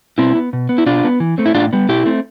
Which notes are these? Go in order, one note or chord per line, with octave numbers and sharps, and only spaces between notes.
B2 C4 E4
B3
B2
B3
E4
B2 D4 F4
B3
E3
A3 C4
E4
A2 D4 F4
G3 B3
B2 E4 G4
A3 C4